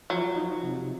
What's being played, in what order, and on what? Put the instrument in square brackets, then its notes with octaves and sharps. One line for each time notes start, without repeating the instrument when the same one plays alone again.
[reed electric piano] F3 [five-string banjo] F#3
[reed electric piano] D#4
C3